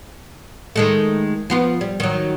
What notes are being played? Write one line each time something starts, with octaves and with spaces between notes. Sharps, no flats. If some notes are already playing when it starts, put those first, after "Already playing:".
D#3 G#3 A3
F3 B3 F4
G3
D#3 F#3